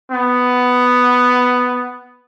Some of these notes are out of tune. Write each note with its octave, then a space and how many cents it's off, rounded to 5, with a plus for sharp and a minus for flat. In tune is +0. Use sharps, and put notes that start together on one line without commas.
B3 +5